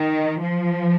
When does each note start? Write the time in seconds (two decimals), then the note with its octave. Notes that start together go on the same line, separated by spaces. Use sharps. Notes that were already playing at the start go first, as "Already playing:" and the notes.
Already playing: D#3
0.41 F3